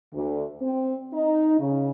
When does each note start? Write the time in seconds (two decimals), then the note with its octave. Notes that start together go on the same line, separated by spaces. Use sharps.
0.12 D2
0.61 C4
1.12 D#4
1.59 C#3